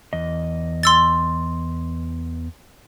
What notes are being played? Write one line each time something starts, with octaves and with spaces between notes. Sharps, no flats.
E2 D#5
C6 E6 A6